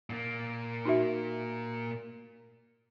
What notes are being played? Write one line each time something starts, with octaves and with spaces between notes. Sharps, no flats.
A#2 A#3
D#4 F#4 E5